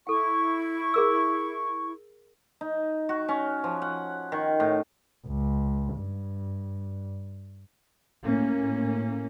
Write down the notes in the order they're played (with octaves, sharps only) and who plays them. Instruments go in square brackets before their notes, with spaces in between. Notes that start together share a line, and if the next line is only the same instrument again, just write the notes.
[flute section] E4 C#6 [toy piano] A4 G5
[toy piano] G#4 A#4 E6
[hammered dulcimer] D#4
F#4
C#4
F3
F#5
D#3
A2
[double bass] C#2
G2
[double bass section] A2 A#3 C#4